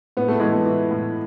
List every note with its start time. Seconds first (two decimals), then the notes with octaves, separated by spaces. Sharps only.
0.17 A2 B3
0.28 A3
0.40 E3 G#3
0.52 A3
0.65 E3
0.91 A2